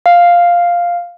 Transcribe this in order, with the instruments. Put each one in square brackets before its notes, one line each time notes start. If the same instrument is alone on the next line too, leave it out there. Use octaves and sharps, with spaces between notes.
[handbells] F5